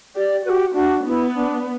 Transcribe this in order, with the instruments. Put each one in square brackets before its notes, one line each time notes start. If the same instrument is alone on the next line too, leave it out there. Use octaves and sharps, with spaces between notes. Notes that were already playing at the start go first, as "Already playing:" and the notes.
[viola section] G4 [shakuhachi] D5
[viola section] F#4 [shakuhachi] B4
[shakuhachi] G4
[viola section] D4 [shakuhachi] F#4
[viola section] B3 [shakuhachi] E4
[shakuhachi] D4